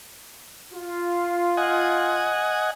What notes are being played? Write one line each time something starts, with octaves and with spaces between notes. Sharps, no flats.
F4
D#5 F#5 G#5